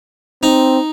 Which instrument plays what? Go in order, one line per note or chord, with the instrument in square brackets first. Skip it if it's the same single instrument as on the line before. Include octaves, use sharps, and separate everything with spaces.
[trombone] C4 [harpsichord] D#4